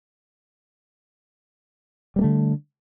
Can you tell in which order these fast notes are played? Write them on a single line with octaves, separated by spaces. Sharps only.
G3 A#3 A3 D3